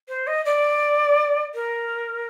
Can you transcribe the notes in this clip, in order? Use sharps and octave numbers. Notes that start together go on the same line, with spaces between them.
C5
D#5
D5
A#4